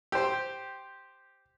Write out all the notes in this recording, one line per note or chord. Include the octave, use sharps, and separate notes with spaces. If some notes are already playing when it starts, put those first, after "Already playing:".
G4 C5